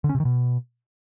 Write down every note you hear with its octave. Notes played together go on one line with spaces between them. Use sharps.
D3
C#4
C3
D#3
B2